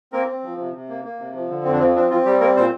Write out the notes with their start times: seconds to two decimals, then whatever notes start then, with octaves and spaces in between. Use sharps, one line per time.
0.12 A#3 C4 A#4
0.28 C4
0.43 F3
0.58 C3
0.74 C3
0.89 A#3
1.04 A#3
1.19 C3
1.35 F3
1.49 D3
1.64 F2 C4
1.72 D4
1.79 F3 C4
1.95 C4 D4
2.10 F3 C4 F4
2.25 G3 G4
2.40 A#3 C4 A#4
2.56 A#2 C4 C5